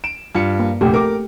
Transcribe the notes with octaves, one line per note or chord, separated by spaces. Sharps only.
D7 E7
G2 F4 C#7
A#3
F1 A#1 A3 G4 A4
A#4 D6